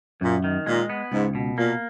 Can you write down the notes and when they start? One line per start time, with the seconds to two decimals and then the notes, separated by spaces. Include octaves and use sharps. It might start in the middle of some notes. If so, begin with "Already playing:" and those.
0.21 F#2 A#2
0.44 D#3
0.66 A#2 G#3
0.89 B3
1.12 C#2 G#2
1.35 B2
1.57 A#2 A#3